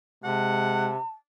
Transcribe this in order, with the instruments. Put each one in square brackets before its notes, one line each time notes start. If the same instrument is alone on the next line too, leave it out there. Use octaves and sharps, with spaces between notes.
[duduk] C3 [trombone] G#3 [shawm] F#5 [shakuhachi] A5